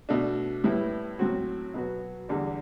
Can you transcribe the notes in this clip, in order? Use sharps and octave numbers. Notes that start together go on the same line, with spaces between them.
B2 A3 D4
A2 G3 B3 E4
A2 F#3 C4 F#4
B2 F#3 B3 F#4
E2 D3 G3 D4